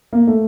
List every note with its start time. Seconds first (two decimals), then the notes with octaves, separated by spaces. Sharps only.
0.13 A#3
0.27 A3